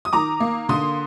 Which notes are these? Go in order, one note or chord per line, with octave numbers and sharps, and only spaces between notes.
D#6
D#3 A#5 D6
A#3
D3 C6 D#6